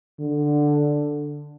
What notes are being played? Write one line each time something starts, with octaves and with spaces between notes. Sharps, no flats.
D3